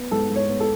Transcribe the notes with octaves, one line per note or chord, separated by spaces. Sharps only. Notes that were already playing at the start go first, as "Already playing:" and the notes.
Already playing: B3
G#2 A4
G#2
C#5
B3
A4